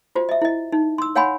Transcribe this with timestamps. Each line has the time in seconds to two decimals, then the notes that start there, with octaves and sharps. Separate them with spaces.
0.15 F4 F#4 C5
0.29 D#5 E5
0.42 E4 D#5
0.72 D#4
0.98 C6 E6
1.15 C#5 F5 F#5 G#5 B5 C6